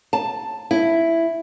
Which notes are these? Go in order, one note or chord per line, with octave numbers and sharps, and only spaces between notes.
A5
E4